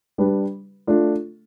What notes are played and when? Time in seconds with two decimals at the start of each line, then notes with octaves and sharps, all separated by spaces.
0.18 G3 D4 G4 B4
0.87 A3 D4 F4